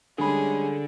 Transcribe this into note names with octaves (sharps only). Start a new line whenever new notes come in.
D3 G3 G#3 C#4 G#4 A4 B5